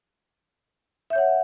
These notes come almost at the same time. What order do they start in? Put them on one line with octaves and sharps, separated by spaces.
E5 G6 C#5 F#5